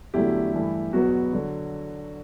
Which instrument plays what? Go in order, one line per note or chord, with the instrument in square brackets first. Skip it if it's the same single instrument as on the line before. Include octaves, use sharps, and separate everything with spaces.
[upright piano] E2 D3 F#3 A3 E4 G4
G2 E3 A3
E2 B2 F#3 B3 F#4
D3 F#3